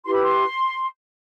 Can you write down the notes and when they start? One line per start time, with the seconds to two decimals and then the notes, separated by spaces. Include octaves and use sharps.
0.04 E4 G4 B4 C6
0.13 B5
0.23 C6